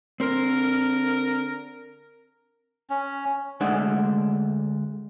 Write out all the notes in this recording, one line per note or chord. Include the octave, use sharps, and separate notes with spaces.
D3 C4 A#4 C5
C#4
D2 G#3 A3 D4 F#5